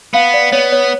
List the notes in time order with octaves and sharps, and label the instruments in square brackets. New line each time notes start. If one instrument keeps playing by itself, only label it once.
[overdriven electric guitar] B3 [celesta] F5
[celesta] D5
[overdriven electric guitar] B3 [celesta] C#5
[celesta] C#5